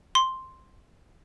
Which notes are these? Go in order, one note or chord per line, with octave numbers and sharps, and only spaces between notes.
C6